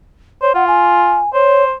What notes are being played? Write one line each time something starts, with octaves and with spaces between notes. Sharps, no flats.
C5 C#5
F4 F#5
G#5
C5 C#5